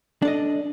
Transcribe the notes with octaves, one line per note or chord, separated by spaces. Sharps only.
D4 A4 D#5